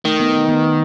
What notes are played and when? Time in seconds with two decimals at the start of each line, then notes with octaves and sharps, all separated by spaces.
0.05 D#3 A3
0.20 B3
0.34 B3
0.49 B3